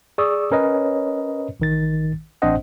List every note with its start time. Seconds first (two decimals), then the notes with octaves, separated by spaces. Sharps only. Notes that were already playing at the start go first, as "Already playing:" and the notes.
0.18 G#4 D5 C#6 D#6 E6
0.51 C#4 A#4 B4 C#5 D#5
1.60 A1 D#3 A6
2.42 A1 C4 D4 C5 D#5 F#5